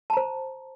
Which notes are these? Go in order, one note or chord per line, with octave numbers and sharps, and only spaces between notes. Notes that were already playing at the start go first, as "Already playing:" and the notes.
C5 A5 A#5